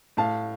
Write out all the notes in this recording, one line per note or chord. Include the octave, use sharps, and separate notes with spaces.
A2 F5 A5